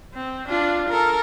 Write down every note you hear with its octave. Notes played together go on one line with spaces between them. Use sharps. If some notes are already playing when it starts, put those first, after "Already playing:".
C4
D4 F4
A4 A#4